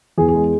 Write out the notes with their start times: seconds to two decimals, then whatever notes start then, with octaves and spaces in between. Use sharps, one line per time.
0.18 E2 G#4
0.29 G#4
0.34 G#3